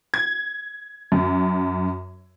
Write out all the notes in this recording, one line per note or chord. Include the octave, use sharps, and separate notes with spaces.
G#6
F#2